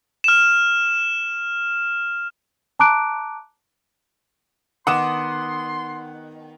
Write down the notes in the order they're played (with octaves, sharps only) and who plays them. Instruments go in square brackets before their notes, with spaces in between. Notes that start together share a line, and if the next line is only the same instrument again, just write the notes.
[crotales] F6 E7
[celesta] A5 A#5 D6 F#6 D7
[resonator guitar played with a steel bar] D#3 B3 [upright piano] F#5 D#6 E7 [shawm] C6 [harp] D6